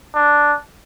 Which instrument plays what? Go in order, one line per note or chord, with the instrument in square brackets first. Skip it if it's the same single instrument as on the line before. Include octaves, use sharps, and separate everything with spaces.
[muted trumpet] D4